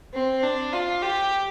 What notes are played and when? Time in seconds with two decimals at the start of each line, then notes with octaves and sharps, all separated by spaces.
0.14 C4
0.43 D4
0.72 F4
1.02 G4